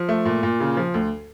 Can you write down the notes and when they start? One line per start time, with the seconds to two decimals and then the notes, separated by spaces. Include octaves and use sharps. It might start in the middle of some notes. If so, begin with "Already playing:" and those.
Already playing: F3
0.09 A3
0.25 A#2
0.43 A#2
0.60 C#3
0.77 F3
0.94 D2